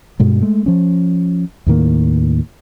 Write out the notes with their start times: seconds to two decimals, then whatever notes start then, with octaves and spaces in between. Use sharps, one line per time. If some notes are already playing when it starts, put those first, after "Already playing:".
0.20 G2 B2 G#3
0.42 G#3 A3
0.66 F3 C#4
1.66 D#2 A2 D#3 A#3